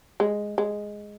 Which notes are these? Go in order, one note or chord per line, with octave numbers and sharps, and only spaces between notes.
G#3
G#3